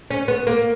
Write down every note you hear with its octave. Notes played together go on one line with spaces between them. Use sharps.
C#4
B3
A#3